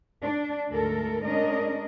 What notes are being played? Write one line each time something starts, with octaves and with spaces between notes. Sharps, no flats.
D4
D2 G#2 A4 A#4
G#3 C#4 D4 A#4 D#5